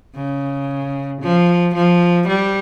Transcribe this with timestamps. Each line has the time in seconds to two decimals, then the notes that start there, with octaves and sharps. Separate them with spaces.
0.15 C#3
1.22 F3
1.75 F3
2.28 G3